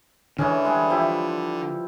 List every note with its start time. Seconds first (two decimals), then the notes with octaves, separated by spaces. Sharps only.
0.39 D3 E3 G#3 C#4
0.65 G3 G#3 C6
0.90 F3 G3 E4